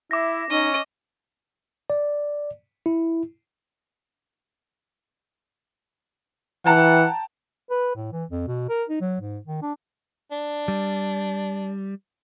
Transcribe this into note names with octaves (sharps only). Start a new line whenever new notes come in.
E4 E5 D6 A#6
C#4 D#4 D#5
D5
E4
E3 F#5 G5 A5 A#5
B4
A2
E3
F2
B2
A#4
D#4
F#3
G#2
D#3
D4
D4
G3